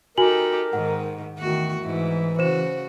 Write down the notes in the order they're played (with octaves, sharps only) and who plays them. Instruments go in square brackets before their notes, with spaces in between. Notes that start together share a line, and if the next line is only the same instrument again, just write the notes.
[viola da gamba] D#4 G4 A4 [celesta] F#4 G#5 F#7 [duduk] A#4
[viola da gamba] G#2 D#3 [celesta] F#5
[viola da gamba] E2 A3 F#4 [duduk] D#3
[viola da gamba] G#2 E4 [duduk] E3
[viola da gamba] C#3 F#4 [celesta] C5 E7